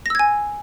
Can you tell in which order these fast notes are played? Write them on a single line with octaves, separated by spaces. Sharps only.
A#6 E6 G#6 G#5